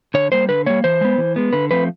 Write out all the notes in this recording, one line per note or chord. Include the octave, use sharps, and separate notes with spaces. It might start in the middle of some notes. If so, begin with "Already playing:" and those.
D3 C#5
G3 A#3 C5
D3 B4
G3 A#3 C#5
E3 C5
G#3 B3
E3
G#3 B3
D3 B4
F3 A3 C4 B4